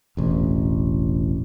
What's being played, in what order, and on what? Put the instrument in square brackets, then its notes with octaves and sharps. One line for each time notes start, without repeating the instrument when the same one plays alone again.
[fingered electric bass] E1 A1